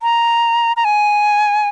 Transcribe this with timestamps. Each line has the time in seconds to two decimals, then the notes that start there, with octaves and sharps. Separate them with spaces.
0.02 A#5
0.77 A#5
0.85 G#5